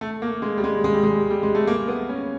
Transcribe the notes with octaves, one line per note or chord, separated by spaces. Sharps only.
A3
A#3
G#3
G3
G#3
G#3
G3
G#3
G3
G#3
A3
A#3
B3
C#4